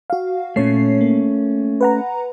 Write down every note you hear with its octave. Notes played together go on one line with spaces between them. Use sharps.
F#4 F5
A#2 A3 C#4 C#5 C7
A#3
B4 F#5 A#5